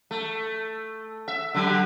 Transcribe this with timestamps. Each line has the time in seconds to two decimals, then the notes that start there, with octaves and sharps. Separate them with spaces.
0.11 A3
1.28 E5
1.54 D3 F#3